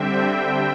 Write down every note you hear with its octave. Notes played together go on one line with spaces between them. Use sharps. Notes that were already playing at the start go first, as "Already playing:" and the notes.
Already playing: D3 G3 C4 E5 G5
G5